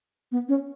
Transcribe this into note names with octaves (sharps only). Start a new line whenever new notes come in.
B3
C#4